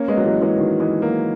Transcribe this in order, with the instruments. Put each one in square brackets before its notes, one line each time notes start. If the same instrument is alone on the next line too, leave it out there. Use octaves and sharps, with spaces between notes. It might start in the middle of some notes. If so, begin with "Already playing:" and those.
Already playing: [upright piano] A#3 C#4
G#3 B3
F#3
E3 G#3
E3 G#3
D#3 F#3
E3 G#3
F#3 A#3